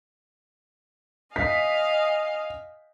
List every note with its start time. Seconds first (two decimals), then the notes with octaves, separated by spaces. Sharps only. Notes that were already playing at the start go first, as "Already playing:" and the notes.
1.36 D#5 F5 G#5 B6